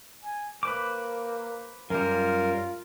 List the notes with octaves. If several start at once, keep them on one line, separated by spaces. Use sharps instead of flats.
G#5
A#3 B4 C5 D6
F#2 G3 F4 A#4